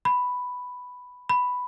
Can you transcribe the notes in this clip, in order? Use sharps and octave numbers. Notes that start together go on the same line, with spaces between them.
B5
B5